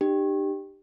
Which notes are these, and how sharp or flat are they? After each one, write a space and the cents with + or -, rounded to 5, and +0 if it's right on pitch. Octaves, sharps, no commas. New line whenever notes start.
D4 +45 G4 +0